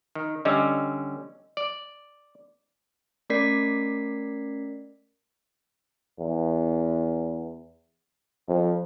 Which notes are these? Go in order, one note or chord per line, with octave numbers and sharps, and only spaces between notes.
D#3
D3 G3 C#4 D#5 E6
D5
A3 C#4 A#4 D5 B6 C7
E2
F2